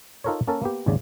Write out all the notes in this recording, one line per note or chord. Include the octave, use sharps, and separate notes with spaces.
D#4 F4 A4 A#4 C5 C#5
A#3 C#4 A4 A#4 A5
A#3 B3 G4
G#1 D#2 C#3 D5